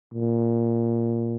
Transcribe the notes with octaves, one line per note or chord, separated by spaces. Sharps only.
A#2